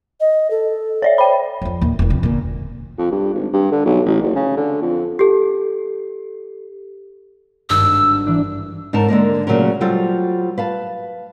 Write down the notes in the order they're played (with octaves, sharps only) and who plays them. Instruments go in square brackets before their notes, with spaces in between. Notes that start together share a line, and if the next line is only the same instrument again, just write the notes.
[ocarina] D#5
A4
[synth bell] C#5 D5 E5
[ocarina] C5 [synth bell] G5 B5
[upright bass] F2 F3
D#2 A#2
E1 E3
F2 C3
A#2 D3
[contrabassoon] F2
G2
G#1
G2
D3
B1
A1
F#1
C#3
D3
F2
[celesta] G4 A4
[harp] G#1 G2 [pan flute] E6
[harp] E3 D4
[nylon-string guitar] G#2 C#3 D#4 A#4 A5
D3 G#3 A#3 A#4
A#2 C#3 F#3 A3 C#4 A#4
F#3 G3 F4 A4 C5
B4 F5 A5